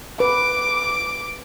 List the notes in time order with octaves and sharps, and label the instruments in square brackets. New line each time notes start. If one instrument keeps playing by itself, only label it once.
[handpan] B4 [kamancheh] D6